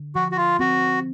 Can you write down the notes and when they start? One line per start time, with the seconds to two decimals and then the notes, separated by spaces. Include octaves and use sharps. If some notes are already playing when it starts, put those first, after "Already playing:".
Already playing: D3
0.15 F3 F#4
0.32 F#4
0.37 F4
0.59 C4 F#4